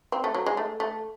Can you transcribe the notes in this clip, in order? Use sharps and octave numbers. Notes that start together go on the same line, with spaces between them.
C4
A3
F#3
G#3
A3
A3